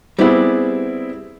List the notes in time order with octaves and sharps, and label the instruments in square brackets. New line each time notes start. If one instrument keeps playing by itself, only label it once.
[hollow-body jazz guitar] G3 B3 [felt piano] C4 E4 G#4